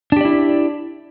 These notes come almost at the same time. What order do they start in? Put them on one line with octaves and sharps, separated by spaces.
D4 G4 D5 E4